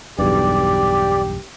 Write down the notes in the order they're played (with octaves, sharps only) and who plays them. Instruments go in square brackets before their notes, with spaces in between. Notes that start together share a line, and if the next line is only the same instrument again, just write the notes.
[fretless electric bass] B1 E2 G2 [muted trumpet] G4 [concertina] D5